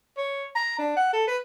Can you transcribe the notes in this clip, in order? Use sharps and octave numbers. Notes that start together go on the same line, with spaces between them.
C#5
A#5
D4
F#5
A4
B4